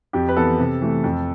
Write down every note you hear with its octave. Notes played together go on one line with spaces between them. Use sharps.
F2 G4
B4
E3 B3 A4
C3
E3 A3
F2